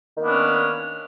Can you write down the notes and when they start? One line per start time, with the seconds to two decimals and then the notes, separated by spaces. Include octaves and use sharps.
0.16 D#3
0.19 A#3
0.23 B3
0.26 D4
0.29 C#4